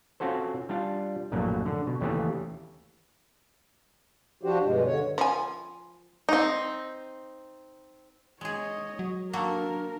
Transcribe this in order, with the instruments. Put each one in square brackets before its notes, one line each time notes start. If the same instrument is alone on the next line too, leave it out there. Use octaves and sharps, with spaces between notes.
[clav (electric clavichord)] C4 C#4 F4 F#4 A4 C5
G3 D4 F4
A#1 F#2 A2 F#3 A#3
D3
B2
D#2 C#3 E3 A3 G4 G#4
[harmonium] F3 D4 F#4 G4 C5
G2 B2 G#3
D3 C#5
[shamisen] F3 G#5
[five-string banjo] C4 D#4
[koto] G#3 G#4 [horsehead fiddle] C#5 D#5
[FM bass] F#3
[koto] A#3 F#4 A4 [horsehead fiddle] D4 A#4